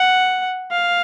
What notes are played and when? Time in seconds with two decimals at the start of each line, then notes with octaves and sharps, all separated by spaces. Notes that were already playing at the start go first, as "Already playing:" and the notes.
Already playing: F#5
0.72 F5